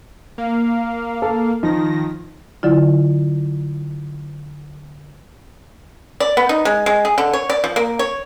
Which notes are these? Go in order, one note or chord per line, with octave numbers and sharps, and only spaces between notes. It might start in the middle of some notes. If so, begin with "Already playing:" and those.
A#3 F5
A4
D#3 F3 D#4 A#6
D3 F#3 E4 F4
D5
B3
D#4
G#3
G#3
G#4
D3
C#5
D5
F3
A#3
C#5